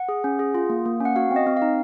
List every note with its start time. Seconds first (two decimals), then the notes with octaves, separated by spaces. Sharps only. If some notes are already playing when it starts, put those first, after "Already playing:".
Already playing: F#5
0.09 G#4
0.24 C#4
0.39 G#4
0.54 F4
0.70 A#3
0.85 A#3
1.00 C#4 F#5
1.16 F#4 F5
1.31 C4
1.36 D#5
1.47 C4
1.57 F5
1.62 D#4